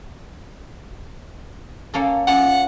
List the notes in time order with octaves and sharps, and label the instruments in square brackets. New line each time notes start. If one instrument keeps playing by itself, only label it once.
[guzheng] A#3 C#4 A4
[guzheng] A#3 C#4 F4 [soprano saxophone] F#5